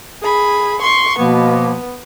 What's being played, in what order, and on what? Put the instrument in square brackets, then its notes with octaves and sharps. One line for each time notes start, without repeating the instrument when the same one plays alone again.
[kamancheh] G#4 B5
C6 C#6
[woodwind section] B2 F3 A#3 [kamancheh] B3